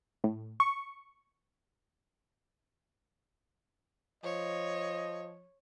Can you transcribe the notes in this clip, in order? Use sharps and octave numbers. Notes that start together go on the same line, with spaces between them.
A2
C#6
F3 C#5 D#5